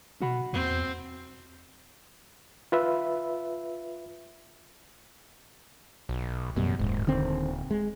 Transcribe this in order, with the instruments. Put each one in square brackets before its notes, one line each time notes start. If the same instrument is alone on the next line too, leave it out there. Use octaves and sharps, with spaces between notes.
[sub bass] B2 [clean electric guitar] F#4 F#5 B5
[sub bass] E2 [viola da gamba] C4
[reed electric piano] F4 B4 E5
[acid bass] B1
[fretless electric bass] A1 B2 G3 [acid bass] F#2
[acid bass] D#1 [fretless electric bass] G#2
[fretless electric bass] D3 D#3 C4
G#3